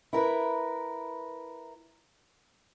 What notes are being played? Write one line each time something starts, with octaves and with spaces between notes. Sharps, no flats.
E4 A#4 B4